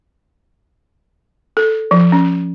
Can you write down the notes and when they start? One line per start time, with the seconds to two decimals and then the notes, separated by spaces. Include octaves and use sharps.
1.57 A4
1.91 F3
2.12 C#4